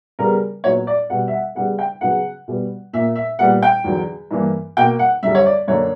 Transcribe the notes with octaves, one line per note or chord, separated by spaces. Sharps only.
C#3 G3 B3 A#4
A#2 F#3 B3 C#5
D5
B2 G3 B3 F#5
E5
F#5
C#3 G3 B3 F#5
G5
C#3 F#3 B3 F#5
B2 G3 B3
A#2 A#3 E5
E5
A#2 G3 B3 F#5
G5
E2 D3 F#3
G2 E3 A#3
B2 A#3 G5
F#5
F#2 D3 G3 E5
C#5
D5
F#2 D3 A#3 C#5